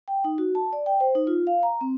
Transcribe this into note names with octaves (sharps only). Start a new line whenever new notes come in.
G5
D#4
F#4
A5
D5
G5
C5
D#4
F4
F5
A#5
C4